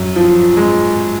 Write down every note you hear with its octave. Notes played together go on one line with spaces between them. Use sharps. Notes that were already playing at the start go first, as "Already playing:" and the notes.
Already playing: F#2
F3
G#3